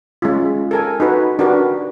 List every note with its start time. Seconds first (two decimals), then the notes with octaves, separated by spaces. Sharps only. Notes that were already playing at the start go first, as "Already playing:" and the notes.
0.22 G#3 C#4 F4
0.71 A4 A#4 G#5
1.00 D#4 F#4 B4
1.39 D4 F#4 G4 A#4 B4